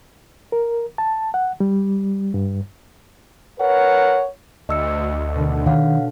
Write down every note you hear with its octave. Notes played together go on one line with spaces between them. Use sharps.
A#4
A5
F#5
G3
G2
A#4 B4 C#5 F#5
D2 D#5 E6 C#7
B2 D3
D#3 C#5 F5 F#5